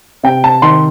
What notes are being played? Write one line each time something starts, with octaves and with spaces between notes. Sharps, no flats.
C3 G5
A5
D#3 C6